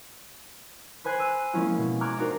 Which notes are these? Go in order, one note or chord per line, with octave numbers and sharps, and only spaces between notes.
B4 C5 G#5 F#6 C7
E6 F#6 D#7
F3 G#3 A#3 C#4 E4 F4
B2
A#5 C#6 D6 F6 F#6 G#6
D4 D#4 F#4 A#4 C5